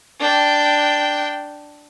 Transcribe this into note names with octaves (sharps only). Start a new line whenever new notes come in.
D4 G5